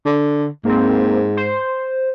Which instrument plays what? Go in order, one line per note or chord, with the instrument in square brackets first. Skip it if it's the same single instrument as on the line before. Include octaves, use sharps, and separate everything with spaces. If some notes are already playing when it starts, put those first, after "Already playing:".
[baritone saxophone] D3
[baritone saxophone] G#2 [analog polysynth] A#3 C4
[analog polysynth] C5